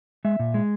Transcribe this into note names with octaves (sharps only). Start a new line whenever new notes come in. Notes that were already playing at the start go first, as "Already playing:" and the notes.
G#3 E5
A#2
G#3